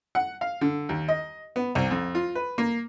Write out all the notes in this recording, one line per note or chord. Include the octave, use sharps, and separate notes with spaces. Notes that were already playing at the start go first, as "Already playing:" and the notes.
F#5
F5
D3
D#2
D#5
B3
C2
F2
F4
B4
A#3